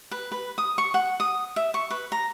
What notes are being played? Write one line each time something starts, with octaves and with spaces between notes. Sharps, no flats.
B4
B4
D#6
C#6
F#5
D#6
E5
C#6
B4
A#5